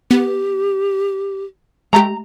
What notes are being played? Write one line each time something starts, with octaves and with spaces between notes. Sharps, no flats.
B3 G4
G#3 A3 G4 A#5